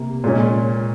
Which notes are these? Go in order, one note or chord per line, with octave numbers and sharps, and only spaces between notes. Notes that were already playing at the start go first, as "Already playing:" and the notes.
Already playing: C3 A#3
A#2 G#3 C#4